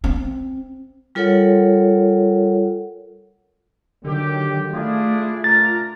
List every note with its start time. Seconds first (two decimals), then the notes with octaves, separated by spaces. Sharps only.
0.04 C4
1.15 G3 F4 A4 A#4 C#5 F#5
4.04 D3 D#3 F#3 G4
4.73 A3 D4 E4 F4 G#4
5.44 D4 A#4 A#5 A6